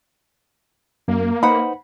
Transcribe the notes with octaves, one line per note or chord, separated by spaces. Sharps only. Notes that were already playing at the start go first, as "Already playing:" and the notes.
F#2 A#3
D#4 B4 C5 F#5 B5